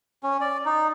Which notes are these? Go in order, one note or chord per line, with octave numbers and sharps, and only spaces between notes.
C#4
D5
D#4